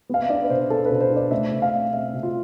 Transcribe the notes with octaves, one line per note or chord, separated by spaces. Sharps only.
B3 F5
E5
D4 D5
B4
B2 C5
D4 A4
B2 B4
C5
D4
D5
A3 E5
B2
F5
C4
C4 E5
B2
F4